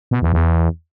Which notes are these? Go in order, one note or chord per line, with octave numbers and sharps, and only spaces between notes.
B2
E2
E2